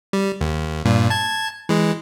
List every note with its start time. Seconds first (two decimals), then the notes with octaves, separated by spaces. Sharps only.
0.13 G3
0.41 D#2
0.85 G2 A#2
1.10 A5 G#6
1.69 E3 G#3